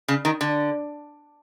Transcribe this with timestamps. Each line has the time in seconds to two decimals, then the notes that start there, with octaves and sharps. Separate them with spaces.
0.08 C#3
0.25 D#3
0.41 D3